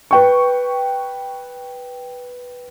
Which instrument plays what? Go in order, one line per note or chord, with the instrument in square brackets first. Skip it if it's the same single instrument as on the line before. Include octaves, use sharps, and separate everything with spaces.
[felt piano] B4 G5 C#6